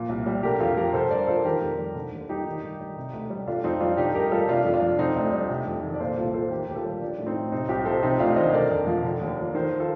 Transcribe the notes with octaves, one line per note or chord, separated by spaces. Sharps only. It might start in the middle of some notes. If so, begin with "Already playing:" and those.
Already playing: A#2 F3
C2
G3
D3 G4 A#4
F2 F4 A4
F3 G4 A#4
D3 A4 C5
G2 A#4 D5
F3 A4 C5
D#3 G4 A#4
F2
G3
D3
D#2
G3 D#4 G4
D#3
G2
G3
C3
D2
G3
D3 D4 F4
F2 C4 D#4
G3 D4 F4
D3 D#4 G4
G2 G4 A#4
G3 F4 A4
C3 D4 F4
F2
D4 F4
F3
D3 C4 D#4
D2 D4
G3 D4
C3
F2
D#3
D5
A#2 A4 C5
C2 F4 A4
F3 A4 C5
D#3 G4 A#4
D#2 G4
F4 A4
G3
F3 D4
A2
C4 D#4
A2
C3 C4 D#4
C2 D#4 G4
F3 A4 C5
C3 C4 D#4
D2 D4 F4
D#3 C5 D#5
D3 A#4 D5
F2
F3
D3
D#2
F3
D#3 A4 C5
F4 A4